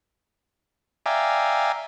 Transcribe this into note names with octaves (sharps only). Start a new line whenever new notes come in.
D5 E5 F5 G5 G#5 A#5